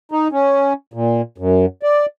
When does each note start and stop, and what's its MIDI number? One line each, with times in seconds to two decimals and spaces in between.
0.12 0.28 63
0.32 0.73 61
0.94 1.21 46
1.38 1.66 42
1.83 2.06 74